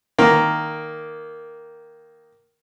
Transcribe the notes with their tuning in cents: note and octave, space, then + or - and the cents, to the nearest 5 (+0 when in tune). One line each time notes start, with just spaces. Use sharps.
D#3 +0 A#3 +0